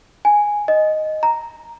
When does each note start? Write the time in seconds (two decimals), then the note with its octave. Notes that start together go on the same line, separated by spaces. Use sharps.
0.25 G#5
0.68 D#5
1.23 A#5